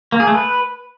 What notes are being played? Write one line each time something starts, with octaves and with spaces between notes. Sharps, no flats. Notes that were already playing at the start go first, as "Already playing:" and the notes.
A#3
G#4
A3
B4